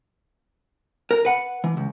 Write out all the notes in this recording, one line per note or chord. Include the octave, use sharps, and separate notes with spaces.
A#4
B4 F#5
E3
C#2